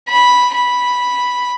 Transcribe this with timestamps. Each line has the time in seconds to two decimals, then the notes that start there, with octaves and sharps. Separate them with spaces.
0.09 B5
0.54 B5